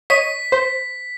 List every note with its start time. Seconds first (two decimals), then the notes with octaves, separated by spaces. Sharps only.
0.10 C#5 D#5 B6 D#7
0.52 C5